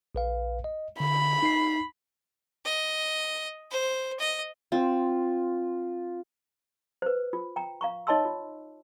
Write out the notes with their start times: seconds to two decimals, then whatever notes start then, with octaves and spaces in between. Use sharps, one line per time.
0.15 A#1 B4 F5
0.64 D#5
1.00 D3 B5
1.43 D#4 C7
2.65 D#5
3.71 C5
4.20 D#5
4.72 C4 F4
7.02 B4 C5
7.33 F4
7.56 G5 A#5
7.81 F5 A#5 C#6
8.07 D#4 C#5 D#5 A5 C6 E6
8.25 F4